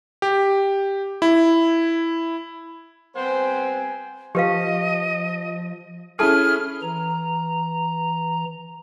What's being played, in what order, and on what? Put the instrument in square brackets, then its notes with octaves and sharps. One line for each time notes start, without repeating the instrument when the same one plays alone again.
[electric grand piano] G4
E4
[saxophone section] G3 B3 C4 [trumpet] C5 [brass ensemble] G#5
[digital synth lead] F3 [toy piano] G4 B4 F5 [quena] D#5
[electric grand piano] C#4 E4 G#4 [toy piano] A4 A5 [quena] F6
[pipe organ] E3 A#5